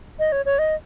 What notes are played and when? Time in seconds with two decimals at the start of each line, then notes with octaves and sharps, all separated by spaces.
0.19 D#5
0.32 C#5
0.46 C#5
0.59 D#5